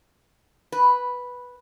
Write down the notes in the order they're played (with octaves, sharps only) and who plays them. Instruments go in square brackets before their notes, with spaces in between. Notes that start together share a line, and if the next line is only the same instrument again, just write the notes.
[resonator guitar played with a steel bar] B4